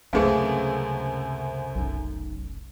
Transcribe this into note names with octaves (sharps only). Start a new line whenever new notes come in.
C#2 F#2 C3 A3 C4 G#4 B4 F5
F1 B1 C#4